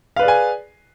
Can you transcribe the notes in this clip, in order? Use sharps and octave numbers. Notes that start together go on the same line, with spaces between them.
G#4 B4 D5 F5 G#5